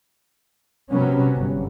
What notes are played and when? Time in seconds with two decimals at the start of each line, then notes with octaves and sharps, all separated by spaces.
0.91 C3 F#3 B3 C#4
1.36 G1